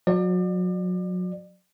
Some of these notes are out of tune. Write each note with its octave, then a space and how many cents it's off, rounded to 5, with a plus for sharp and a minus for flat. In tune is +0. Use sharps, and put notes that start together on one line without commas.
F#3 -30 D5 +35